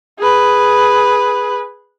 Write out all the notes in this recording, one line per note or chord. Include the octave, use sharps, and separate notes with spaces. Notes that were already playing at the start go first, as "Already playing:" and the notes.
G#4 B4